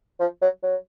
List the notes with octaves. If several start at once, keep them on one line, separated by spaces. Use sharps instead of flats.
F3
F#3
F#3